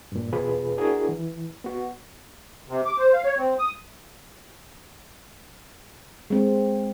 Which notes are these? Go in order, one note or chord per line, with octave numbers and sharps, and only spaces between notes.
G2 A#2
E2 B2 F4 G#4 B4
D4 E4 F#4 G#4 A#4
E3
B3 F#4
C3
D6
C5
F5
C#5
C4
D#6
G#3 C4